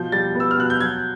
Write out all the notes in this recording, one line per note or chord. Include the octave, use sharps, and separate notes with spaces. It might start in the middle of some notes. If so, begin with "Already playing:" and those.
Already playing: B2 F3 G6
G3 A6
B3
E6
F6
B2 F#6
G6
F#3 G#6